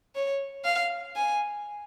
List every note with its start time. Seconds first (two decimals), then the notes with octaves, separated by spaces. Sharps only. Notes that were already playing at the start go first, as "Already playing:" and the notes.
0.15 C#5
0.64 F5
1.16 G#5